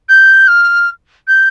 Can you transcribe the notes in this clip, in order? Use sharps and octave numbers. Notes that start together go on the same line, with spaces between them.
G6
F6
G6